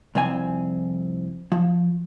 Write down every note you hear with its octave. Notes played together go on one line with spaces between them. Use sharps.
C2 F2 C4 G#5
F3